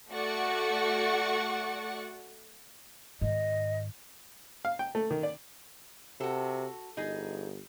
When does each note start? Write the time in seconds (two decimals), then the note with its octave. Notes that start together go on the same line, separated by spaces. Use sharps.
0.10 A3 F#4 D5 F#5 C#6
3.21 G#2 D#3 D#5
4.65 F5
4.79 G5
4.95 A3
5.11 D#3
5.23 D5
6.20 C3 F#4 A4
6.97 G1 D#4 G#4